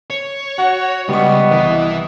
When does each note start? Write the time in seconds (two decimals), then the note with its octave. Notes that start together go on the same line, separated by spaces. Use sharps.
0.10 C#5
0.58 F#4 F#5
1.09 C#2 G3 B3 D#5 C#6
1.51 C2 E3